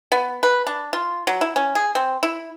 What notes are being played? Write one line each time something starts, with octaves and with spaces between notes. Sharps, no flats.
B3
B4
D4
F4
F#3
E4
C#4
G#4
C4
E4